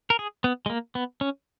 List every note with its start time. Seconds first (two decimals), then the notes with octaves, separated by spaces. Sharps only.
0.10 A#4
0.19 G#4
0.44 B3
0.66 G#3
0.70 A#3
0.95 B3
1.21 C#4